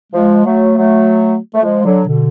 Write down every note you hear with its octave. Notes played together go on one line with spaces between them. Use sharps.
F3 G#3
F#3 A3
F#3 A3
A3
F3 G#3
D3 F#3
B2 D3